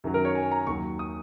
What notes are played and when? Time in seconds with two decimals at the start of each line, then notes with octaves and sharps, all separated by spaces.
0.04 F#2 D#3 F#3
0.14 A#4
0.25 C#5
0.35 G#5
0.52 A#5
0.67 D#2 D#3 F#3 C#6
0.99 D#6